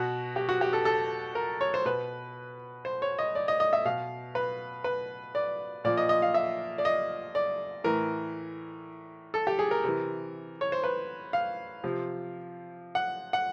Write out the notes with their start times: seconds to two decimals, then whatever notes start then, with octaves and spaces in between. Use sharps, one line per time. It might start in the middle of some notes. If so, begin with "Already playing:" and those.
Already playing: B2 F#4
0.36 G4
0.49 F#4
0.61 G4
0.73 A4
0.85 A4
1.35 A#4
1.61 C#5
1.74 C5
1.85 B2 B4
2.85 C5
3.02 C#5
3.19 D#5
3.35 D5
3.48 D#5
3.60 D#5
3.73 E5
3.85 B2 F5
4.35 B4
4.84 B4
5.35 D5
5.84 A#2 F3 D5
5.97 D#5
6.09 D#5
6.22 F5
6.34 E5
6.78 D5
6.85 D#5
7.35 D5
7.84 A2 E3 A#4
9.34 A4
9.47 G4
9.59 G#4
9.71 A#4
9.84 C3 E3
10.61 C#5
10.72 C5
10.84 B4
11.33 F5
11.84 C3 F3
12.95 F#5
13.33 F#5